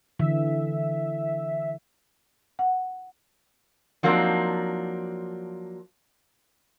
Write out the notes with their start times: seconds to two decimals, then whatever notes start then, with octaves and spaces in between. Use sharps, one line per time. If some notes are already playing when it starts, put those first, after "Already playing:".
0.19 D3 E3 E5
2.59 F#5
4.03 F3 F#3 A#3 C4 D4 D#4